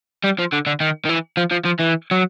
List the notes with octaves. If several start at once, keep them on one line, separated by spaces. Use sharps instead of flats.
G3
F3
D3
D3
D#3
D#3
E3
F3
F3
F3
E3
F#3